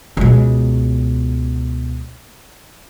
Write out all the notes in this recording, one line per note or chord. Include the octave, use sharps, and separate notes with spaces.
C#2 B2